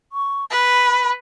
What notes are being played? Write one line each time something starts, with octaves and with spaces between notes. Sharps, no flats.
C#6
B4 B5